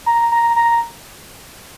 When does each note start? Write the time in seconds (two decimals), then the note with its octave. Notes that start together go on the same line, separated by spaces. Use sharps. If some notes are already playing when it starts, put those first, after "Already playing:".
0.06 A#5
0.32 A#5
0.56 A#5